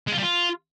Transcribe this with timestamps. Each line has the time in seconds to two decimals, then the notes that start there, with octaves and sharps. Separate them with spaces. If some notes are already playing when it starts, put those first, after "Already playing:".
0.07 G#3
0.12 F4
0.17 G3
0.22 F4